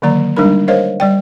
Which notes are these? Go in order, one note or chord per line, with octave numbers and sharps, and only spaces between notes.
D3 D#3 F#3 A#3 D5 A#5
G3 G#3 D4 D#4 A#4 B5
A#4 C5 C#5 D#5 F5
G3 D5 G5